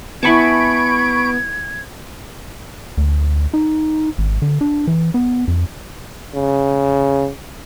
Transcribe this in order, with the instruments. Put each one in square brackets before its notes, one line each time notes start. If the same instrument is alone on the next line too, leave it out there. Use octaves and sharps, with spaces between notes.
[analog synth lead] B3 [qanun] E4 G#5 A5 [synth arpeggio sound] B5 C#6 D7 [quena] G#6
[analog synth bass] D2
D#4
G#1
D3
D4
E3
B3
F2
[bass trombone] C#3